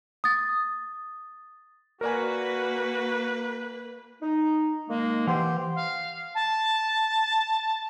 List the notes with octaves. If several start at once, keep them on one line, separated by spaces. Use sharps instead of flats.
D#6 A6
A#3 F#4 A#4 B4 D5 G#5
D#4
D#3 G#3 A#3
E3 G4 C5 F#5 C6
F5
A5